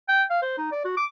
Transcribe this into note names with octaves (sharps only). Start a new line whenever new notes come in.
G5
F5
C5
D#4
D5
F#4
D6